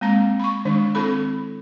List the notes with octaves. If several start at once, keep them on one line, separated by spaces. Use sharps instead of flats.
G#3 A#3 C4 A#5
B5 C#6
D#3 G#3 D4 D5
C4 E4 A4 B5